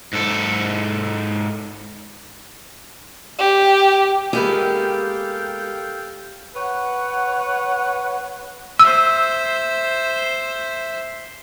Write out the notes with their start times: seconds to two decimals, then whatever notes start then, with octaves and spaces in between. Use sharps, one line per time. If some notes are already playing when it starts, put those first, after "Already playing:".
0.13 G#2 A4
3.39 G4
4.33 G#3 A#3 B3 G4 A4 F5 G5
6.56 B4 C#5 F#5
8.79 C5 E5 E6